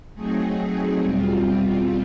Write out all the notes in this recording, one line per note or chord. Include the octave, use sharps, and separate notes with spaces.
F#3 A3 C4 D#4 G#4
E2 B2 G3 C4 F4